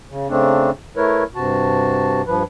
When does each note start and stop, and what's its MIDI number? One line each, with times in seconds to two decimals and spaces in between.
0.10 0.28 49
0.29 0.70 49
0.29 0.70 57
0.29 0.70 60
0.29 0.70 62
0.97 1.24 57
0.97 1.24 64
0.97 1.24 70
0.97 1.24 71
0.97 1.24 73
1.35 2.22 43
1.35 2.22 48
1.35 2.22 66
1.35 2.22 81
2.27 2.43 43
2.27 2.43 53
2.27 2.43 71